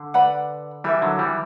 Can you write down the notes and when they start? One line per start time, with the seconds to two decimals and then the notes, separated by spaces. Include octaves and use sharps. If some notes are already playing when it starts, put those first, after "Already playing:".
Already playing: D3
0.14 B4 D5 F#5 B5
0.84 E3 G3 E4 A#4 E5
1.02 D3 F#3
1.19 E3 G3